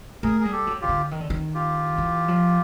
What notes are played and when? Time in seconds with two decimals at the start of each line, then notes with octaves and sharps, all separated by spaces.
0.23 A3 G#4 A#4
0.41 G3 G#4
0.52 G4 A4
0.67 F#3
0.81 C#3 F4 G4
0.89 D3
1.11 D#3
1.21 D3
1.30 D#3
1.54 F4 G4
1.98 E3
2.28 F3